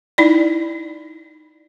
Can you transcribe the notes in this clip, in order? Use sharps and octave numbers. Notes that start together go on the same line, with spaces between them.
D#4 E4 D5